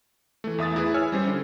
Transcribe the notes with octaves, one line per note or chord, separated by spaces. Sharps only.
E3 A3
E2 E5 D#6 A6
E4 G#4 B4
C#5 G#5 E6 F6
G3 C#4 C5
D3